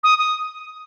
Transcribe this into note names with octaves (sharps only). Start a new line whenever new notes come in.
D#6
D#6